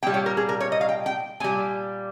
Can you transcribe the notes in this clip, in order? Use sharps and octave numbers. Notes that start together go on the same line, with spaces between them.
A#2 G3 G5
C#5
A#4
G#4
A#4
C#5
D#5
F5
G5
G5
A#2 G3 G#5